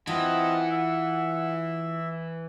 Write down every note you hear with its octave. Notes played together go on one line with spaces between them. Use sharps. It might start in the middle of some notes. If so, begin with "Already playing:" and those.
E3 C4 E4 F4 D#5 F#5 A5
E5